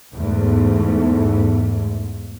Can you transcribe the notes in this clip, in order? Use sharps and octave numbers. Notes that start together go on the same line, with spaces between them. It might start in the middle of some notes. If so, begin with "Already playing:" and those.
E2 G#2 A3